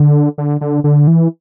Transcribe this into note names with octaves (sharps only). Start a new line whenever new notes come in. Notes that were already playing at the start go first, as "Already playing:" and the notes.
Already playing: D3
D3
D3
D3
E3